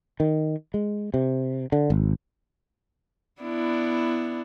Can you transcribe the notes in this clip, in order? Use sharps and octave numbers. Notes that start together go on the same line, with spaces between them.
D#3
G#3
C3
D3
G#1
B3 D4 E4